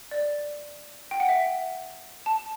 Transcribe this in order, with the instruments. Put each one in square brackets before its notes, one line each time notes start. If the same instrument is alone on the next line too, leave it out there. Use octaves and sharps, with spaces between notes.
[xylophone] D5
G5
F#5
E5
A5